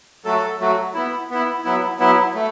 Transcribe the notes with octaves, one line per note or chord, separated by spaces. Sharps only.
F#3 A3 F#4 A4
F#3 A3 F#4
B3 E4
B3 E4
F#3 B3 E4
F#3 B3 E4
A3